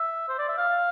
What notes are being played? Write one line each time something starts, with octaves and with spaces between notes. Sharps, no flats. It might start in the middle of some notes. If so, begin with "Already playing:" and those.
Already playing: E5
C5
D5
E5
F5